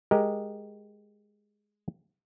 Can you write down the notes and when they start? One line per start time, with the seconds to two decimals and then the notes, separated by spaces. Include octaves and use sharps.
0.11 G#3 G4 A#4 D#5